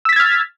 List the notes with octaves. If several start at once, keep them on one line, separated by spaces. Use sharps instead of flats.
E6 F6 G#6 A6 B6